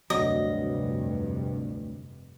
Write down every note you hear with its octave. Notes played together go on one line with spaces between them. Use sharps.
F1 D2 G2 F#3 D#5